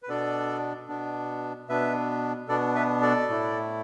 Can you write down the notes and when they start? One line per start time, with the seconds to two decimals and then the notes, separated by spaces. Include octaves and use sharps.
0.03 B4
0.08 B2 B3 D4 A4 D5
0.89 B2 B3 D4
1.69 B2 B3 D4 B4 E5
2.48 B2 B3 D4 A4 D5
2.75 B4 E5
3.02 A4 D5
3.29 A2 A3 E4